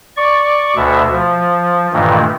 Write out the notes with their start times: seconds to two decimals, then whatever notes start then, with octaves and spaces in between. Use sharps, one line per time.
0.17 D5 C#6
0.76 D2 B2 E5
1.11 F3
1.93 G2 A#2 D#3 E3 A3